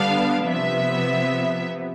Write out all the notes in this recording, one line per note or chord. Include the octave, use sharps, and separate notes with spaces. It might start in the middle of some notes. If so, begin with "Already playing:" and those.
Already playing: D3 G3 B3 D4 F5
C3 F3 B3 E5